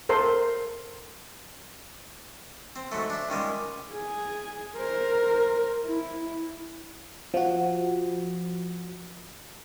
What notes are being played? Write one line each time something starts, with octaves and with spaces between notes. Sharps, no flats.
A4 A#4 C5 C6
C4
G#2 F#3 A3
D4 E5
C#2 D#3 G3 G#3
G#4
A#4 C5
E4
F3 F#4